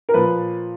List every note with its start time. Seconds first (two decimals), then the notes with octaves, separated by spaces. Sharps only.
0.09 A#4
0.14 A#2 F3 B4